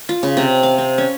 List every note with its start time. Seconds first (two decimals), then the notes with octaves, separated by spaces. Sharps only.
0.09 F4
0.23 C#3
0.37 C3
0.63 F5
0.78 C4
0.98 C#4